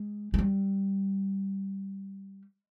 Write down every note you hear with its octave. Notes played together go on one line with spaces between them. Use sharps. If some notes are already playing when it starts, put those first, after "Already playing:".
Already playing: G#3
G#3
G3